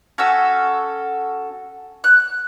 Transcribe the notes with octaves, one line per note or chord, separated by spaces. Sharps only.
C#4 F#4 A4 E6
F#6